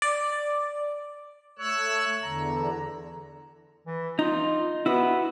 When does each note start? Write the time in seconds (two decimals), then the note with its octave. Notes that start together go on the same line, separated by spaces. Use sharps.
0.02 D5
1.59 A3 C#5 E6 F#6
2.23 E2 D3 A#5
3.86 E3
4.19 D#4 F4
4.86 B3 E4 F#4 B4